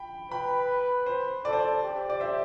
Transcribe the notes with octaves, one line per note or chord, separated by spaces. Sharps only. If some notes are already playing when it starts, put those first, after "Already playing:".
Already playing: G5 B5
B4 G5 B5
C5
A4 D5
C5
D5
G4
D5
C5 E5